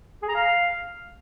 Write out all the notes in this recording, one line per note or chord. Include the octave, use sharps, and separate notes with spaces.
G#4
A#5
F5